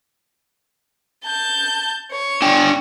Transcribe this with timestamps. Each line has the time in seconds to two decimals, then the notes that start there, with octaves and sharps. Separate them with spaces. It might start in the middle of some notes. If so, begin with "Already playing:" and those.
1.25 A5 G6
2.12 C#5
2.42 D4 G5 G#5